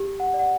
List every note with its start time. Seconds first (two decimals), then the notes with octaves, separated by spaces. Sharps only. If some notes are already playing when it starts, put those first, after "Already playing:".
Already playing: G4
0.20 F#5
0.34 D5
0.39 F#5